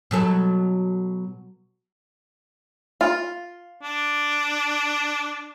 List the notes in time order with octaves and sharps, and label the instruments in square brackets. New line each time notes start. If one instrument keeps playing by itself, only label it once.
[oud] B2 F#3 A4
[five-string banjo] F4
[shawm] D4